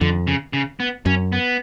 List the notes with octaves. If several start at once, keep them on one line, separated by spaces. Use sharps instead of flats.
F2 D3
C#3
C#3
B3
F#2 C#4
B3